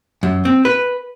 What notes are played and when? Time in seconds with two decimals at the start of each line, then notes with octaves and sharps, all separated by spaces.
0.23 F#2
0.45 C4
0.65 B4